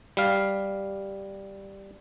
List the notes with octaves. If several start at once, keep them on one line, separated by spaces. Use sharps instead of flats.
G3 F5